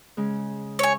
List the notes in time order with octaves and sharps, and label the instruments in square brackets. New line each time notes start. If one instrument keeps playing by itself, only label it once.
[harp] C#3 G#3
[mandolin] C#5 G#5 [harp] E5